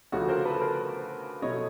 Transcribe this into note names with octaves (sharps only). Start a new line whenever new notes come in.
D2 C#3 F3 A3 C#4 F#4
A#4 C5
A4 B4
A#4 C5
B2 F#3 A3 C#5 D#5